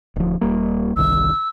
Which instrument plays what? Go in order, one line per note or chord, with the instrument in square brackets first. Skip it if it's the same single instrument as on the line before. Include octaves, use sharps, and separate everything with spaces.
[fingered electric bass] D1 F3
D#1 G3 A#3
[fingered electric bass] G1 C2 D#3 [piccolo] E6